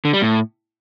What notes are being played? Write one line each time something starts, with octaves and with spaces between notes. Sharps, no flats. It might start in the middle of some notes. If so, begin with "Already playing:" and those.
D3
G3
A2